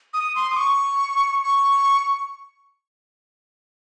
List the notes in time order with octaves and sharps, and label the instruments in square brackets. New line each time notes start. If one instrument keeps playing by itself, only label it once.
[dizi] D#6
C6
D#6
C#6
C#6